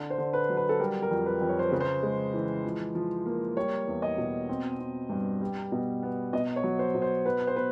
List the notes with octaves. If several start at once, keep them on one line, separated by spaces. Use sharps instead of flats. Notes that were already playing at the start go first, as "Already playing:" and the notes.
Already playing: D3
C5
D3
B4
F#3
B4
A4
G3 A#4
A#4
F2
B4
F2
C#5
C5
C#3 B4
C5
G#3
E3
F3
F3
A#3
G3 C#5
E2
D#5
B2
C4
C4
G2
G3
B2
B3
B2 D#5
C#5
F#3
C5
B2
C5
B3 B4
C5
B3 B4